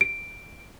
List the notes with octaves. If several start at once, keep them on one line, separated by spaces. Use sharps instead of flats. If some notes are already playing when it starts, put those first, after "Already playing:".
D7